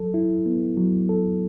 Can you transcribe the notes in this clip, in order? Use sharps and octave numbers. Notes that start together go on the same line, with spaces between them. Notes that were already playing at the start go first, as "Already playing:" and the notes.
Already playing: F#3 A4
E4
B3
F#3
A4